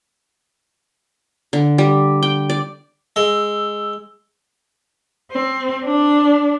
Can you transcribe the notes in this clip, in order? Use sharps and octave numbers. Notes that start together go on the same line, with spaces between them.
D3
G3
G5
D5
G#3 E6
C4
D4